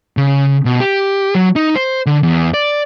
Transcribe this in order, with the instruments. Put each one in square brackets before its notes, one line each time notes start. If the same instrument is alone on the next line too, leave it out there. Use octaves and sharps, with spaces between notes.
[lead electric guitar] C#3
B2
G4
F#3
D#4
C5
D3
E2
D5